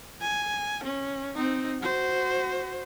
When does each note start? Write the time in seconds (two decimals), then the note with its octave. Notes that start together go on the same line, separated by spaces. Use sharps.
0.21 G#5
0.84 C#4
1.35 C4 D#4
1.81 F#4 C5